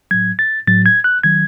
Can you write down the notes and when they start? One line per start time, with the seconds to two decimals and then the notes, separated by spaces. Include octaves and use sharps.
0.11 A2 F#3 G#6
0.39 A6
0.67 A2 F#3 A6
0.86 G#6
1.04 F#6
1.24 D#3 F#3 G#6